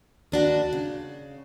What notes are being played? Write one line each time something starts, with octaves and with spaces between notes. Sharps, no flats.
D#2 D4 F#4
C#3